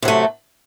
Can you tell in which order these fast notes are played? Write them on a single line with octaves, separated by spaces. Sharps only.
C3 F#3 A3